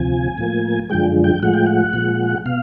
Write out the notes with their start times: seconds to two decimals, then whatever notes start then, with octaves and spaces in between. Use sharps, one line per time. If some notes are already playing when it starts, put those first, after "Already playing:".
Already playing: D2 C3 F3 G#5
0.38 A2 F3 A#3
0.90 F#2 D3 F3 G#3 G5
1.24 G5
1.42 A2 F3 G#3 F#5
1.54 G5
1.66 F#5
1.93 A#2 F3 G#3
2.46 B2 F5